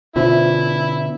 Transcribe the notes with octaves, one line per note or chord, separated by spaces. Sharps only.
B2 D3 E4 F4 C5 E5